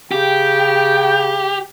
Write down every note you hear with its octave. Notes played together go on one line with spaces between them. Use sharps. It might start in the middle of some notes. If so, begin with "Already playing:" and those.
C#3 G4 G5